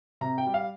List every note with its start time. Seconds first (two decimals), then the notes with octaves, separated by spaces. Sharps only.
0.21 C3 A#5
0.38 G5
0.46 G3
0.54 F5